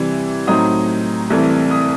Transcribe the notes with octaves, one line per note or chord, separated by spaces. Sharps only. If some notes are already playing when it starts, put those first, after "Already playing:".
Already playing: C3 E3 G3
A2 F#3 C4 D#4 D#6
C2 C3 E3 A3
D#6